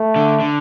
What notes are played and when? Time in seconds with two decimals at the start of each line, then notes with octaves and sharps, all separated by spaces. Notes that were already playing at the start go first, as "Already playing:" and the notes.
Already playing: A3
0.16 D3
0.40 D3